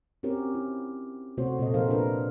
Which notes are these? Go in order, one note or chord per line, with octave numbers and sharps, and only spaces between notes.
C4 C#4 F#4 G4 A#4 C#5
E4
C3 A3 F#4 C5 C#5
A#2 A3 A4 D#5
F3 D#4 G#4 A#4 C5 F5
D4 F4 A#4 B4